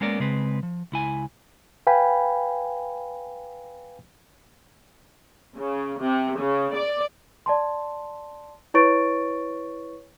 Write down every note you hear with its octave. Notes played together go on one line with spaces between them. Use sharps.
G#3 A#3 B3 C#4 A#4 D5
C#3 G#3 C4 B4
F3
C#2 E4 G#5
B4 F5 G5 G#5 B5
C#3
C3
C#3
D5
D5 A5 C6
E4 B4 C#5 C#6 A6 D7